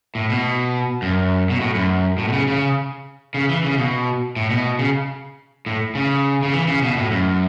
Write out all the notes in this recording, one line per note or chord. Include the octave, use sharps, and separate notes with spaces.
A2
B2
F#2
B2
A2
F#2
A2
B2
C#3
C#3
C#3
E3
C#3
B2
A2
B2
C#3
A2
C#3
C#3
E3
C#3
B2
A2
F#2